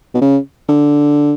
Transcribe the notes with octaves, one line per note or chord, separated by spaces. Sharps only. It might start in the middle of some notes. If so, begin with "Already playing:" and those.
B2
C#3
D3